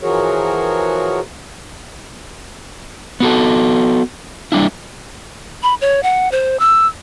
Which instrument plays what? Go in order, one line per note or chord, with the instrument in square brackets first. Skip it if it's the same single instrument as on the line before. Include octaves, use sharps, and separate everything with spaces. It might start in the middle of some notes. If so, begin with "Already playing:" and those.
[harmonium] E3 F3 F#4 G#4 A#4 C#5
[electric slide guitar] B3 F#4 A4
G3 D4 E4
[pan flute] B5
C#5
F#5
C5
E6